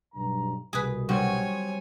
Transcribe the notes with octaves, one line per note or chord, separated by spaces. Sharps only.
B1 G2 A#5
C2 B2 G#4 B4
G3 C4 F#4 C#5 G#5